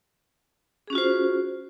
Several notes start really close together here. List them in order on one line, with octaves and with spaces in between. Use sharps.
G#4 C#4 F#4 F4 C5